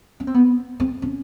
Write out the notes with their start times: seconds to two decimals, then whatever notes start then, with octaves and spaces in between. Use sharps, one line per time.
0.20 C#4
0.27 C4
0.34 B3
0.80 C4
1.02 C#4